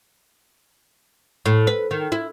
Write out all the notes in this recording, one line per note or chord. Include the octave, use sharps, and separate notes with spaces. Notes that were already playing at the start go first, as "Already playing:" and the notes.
A2
B4
D#3
E4